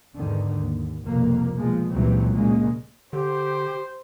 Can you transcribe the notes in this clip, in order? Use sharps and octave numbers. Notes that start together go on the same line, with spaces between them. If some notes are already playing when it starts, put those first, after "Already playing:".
E2 G#2 D3 D#3
D#2
C2 F2 B2 A#3
B2 F3 G#3
C#2 A#2 E3 F#3 G3 C4
A#2 C#3 G#3 A#3
D3 G4 C5